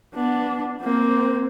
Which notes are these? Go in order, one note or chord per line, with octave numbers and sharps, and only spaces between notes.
B3 D4
A#3 C4